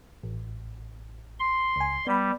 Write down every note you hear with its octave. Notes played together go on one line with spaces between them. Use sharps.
A1
C6
C#2 G#5
G3 B3 B5